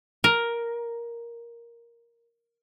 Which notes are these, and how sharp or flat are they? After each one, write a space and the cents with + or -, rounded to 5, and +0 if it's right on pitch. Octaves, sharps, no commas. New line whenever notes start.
A#4 +5